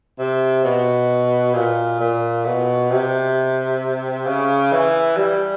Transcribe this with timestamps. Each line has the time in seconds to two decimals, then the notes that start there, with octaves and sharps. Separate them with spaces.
0.19 C3
0.64 B2
1.54 A#2
2.00 A#2
2.46 B2
2.91 C3
4.26 C#3
4.72 E3
5.17 G3